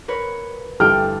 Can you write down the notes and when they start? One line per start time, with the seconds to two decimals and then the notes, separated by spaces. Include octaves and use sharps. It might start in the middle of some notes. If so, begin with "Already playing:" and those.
0.08 A#4 B4 C#5
0.80 G1 G3 E4 G4 A4 G5 F6